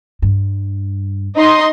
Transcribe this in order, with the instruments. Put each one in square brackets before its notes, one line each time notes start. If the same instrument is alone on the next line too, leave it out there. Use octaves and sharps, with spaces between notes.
[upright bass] G2
[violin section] D#4 D#5 C6